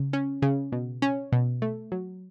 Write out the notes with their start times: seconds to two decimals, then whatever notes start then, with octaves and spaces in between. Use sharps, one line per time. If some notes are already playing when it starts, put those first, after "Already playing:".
Already playing: C#3
0.13 C#4
0.42 C#3
0.72 B2
1.02 C#4
1.32 B2
1.62 A3
1.92 F#3